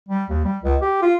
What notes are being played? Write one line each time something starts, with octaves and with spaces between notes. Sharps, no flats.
G3
D#2
G3
C#2
G4
F4